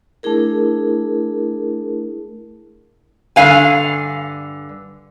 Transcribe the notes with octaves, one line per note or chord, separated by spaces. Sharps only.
A3 D4 E4 G#4 A#4
G2 D3 F5 G#5